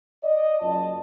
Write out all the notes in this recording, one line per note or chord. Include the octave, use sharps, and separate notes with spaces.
D5 D#5
F#1 F4 D#5 A5